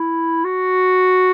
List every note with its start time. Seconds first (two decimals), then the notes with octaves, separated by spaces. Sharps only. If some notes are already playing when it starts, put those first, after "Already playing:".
Already playing: E4
0.44 F#4